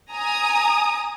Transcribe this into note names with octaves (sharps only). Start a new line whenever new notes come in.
G#5 A#5 D#6